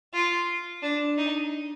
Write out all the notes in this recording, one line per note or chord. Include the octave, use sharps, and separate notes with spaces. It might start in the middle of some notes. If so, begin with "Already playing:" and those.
F4
D4
D#4